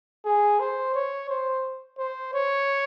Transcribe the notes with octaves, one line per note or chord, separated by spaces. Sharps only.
G#4
C5
C#5
C5
C5
C#5